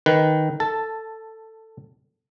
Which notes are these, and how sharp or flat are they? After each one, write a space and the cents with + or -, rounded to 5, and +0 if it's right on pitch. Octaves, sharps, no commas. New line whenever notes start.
D#3 +0 B4 +0
A4 +15 A5 +0